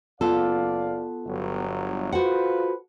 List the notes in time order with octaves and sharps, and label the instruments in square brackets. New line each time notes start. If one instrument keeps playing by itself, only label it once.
[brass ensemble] F#1 D5 F5 [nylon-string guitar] B3 F4 A4
[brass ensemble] G1 F#3
[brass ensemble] F4 B4 C5 [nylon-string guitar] F#4 A4 F#5